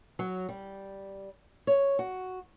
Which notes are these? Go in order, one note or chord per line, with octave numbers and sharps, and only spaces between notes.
F#3
G3
C#5
F#4